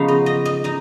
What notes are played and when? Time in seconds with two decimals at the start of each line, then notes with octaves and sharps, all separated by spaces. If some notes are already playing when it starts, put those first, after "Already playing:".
Already playing: C#3 F3 B3 D#4 F5
0.08 D#5
0.26 D#5
0.45 D#5
0.64 D#4 D#5